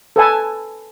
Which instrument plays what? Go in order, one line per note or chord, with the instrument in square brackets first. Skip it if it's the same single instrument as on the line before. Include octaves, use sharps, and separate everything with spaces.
[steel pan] A4 B4 G#5 A5